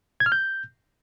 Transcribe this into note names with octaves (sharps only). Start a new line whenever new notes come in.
G#6
F6
G6